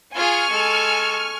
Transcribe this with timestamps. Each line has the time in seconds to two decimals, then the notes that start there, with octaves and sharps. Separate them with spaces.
0.15 F4 G#4 G#5 C#6 F6
0.50 G#3 A4